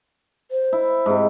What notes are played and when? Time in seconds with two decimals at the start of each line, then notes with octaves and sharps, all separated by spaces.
0.51 C5
0.73 E4
1.06 G#2 C3